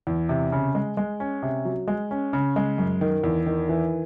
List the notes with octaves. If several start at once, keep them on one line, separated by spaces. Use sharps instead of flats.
E2
C3
C#3
G#3
G#3
C#4
C3
F#3
G#3
C#4
C#3
G#3
F#2
D#3
E2
D#3
E3